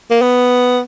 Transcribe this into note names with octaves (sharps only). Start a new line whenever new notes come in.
A#3
B3